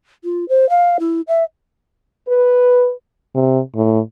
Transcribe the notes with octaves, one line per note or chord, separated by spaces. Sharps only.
F4
C5
F5
E4
E5
B4
C3
A2